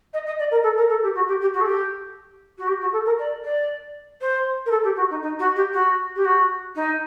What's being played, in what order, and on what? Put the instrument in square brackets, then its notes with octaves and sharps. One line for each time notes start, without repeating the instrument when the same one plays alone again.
[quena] D#5
D#5
D5
A#4
A4
A#4
A4
G4
F#4
G4
G4
F#4
A4
G4
F#4
G4
F#4
A4
A#4
D5
D5
C5
A#4
A4
G4
F#4
D#4
D#4
F#4
G4
F#4
G4
F#4
D#4